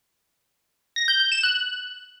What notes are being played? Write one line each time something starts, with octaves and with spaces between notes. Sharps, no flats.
A#6
G6
G6
E7
F#6